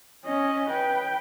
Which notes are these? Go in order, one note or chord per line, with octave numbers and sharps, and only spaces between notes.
C#4 D#5
B4 G5